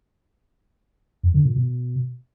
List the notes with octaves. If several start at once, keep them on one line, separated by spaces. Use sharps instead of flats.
F2
D3
A#2
B2